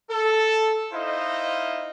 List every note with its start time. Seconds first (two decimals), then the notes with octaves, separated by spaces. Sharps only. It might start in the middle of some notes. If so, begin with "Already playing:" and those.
0.10 A4
0.93 D#4 E4 C5 D#5 F5